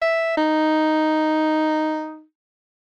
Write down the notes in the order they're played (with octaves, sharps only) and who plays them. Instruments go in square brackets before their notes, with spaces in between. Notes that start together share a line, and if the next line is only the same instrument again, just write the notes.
[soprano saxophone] E5
D#4